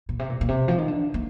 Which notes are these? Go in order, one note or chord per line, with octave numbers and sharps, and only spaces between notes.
A#2
C3
A#2
A#2
C3
F3
D#3
D3
A#3